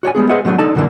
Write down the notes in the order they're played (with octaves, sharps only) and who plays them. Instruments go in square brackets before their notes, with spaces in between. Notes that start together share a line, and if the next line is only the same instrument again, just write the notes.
[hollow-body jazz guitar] F#4 C#5 D5 G#5
G3 G#3 B3 G#4
G#4 B4 C5 D#5 E5 F#5
D3 F#3 A3 B3 D4
D4 D#4 A4 D5 A5
F#2 A#2 D3 E3 A#3 D4